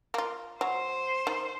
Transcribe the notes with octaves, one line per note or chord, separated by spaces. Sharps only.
A#3 F4
F#3 C5
D#3